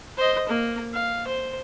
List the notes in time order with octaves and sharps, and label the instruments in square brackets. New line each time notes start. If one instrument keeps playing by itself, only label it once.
[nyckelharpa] C5 D#5
A#3
F5
C5